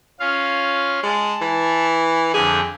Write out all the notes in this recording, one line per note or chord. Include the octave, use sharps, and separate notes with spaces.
C#4 F4 F5
G#3 A5
E3
F2 D3 G4 G#4